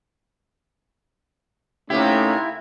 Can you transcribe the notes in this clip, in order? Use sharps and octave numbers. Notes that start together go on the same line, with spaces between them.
C3 A3 A#3 C#4 D#4 E4 G4